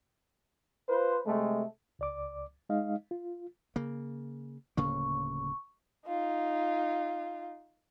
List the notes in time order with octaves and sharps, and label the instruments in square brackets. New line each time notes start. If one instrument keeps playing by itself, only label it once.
[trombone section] F4 B4 C5
C3 G#3 A3
[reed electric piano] C#2 D5 D6
G#3 D#4 D#5 F5
F4
[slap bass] C#3 A#3
[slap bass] D1 C#3 A#3 [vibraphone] C#6
[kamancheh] D#4 F4